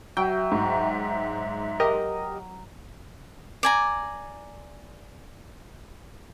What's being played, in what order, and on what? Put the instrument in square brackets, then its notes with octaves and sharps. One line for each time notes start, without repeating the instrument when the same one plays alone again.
[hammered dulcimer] F#3 [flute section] E5 [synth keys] G5
[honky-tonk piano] G#2
[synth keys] G4 A#4 D#5
[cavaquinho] D5 G#5 A#5